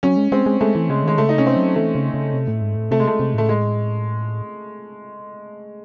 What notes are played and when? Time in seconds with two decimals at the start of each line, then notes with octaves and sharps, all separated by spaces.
0.03 F#3 C#4
0.17 G#3
0.32 G#3 C4
0.46 G#3
0.60 G#3 A3
0.75 E3
0.89 C#3 G#3
1.04 D#3 G#3
1.18 C#3 A3
1.29 D#4
1.38 C3 C#4
1.46 C4
1.57 F#3
1.76 E3 A3
1.95 C#3
2.14 C#3
2.33 C3
2.48 A2
2.62 G#2
2.76 A2
2.91 C3 A3
3.00 G#3
3.07 A3
3.20 C3
3.34 A2 A3
3.49 G#3